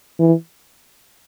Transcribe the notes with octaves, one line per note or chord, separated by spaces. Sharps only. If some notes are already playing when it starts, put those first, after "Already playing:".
E3